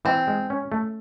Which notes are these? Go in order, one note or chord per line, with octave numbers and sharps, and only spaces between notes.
E3 C4
G#3
C#4
A3